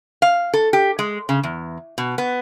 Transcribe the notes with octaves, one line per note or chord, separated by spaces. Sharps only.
F5
A4
G4
G#3
C#3
E2
B2
B3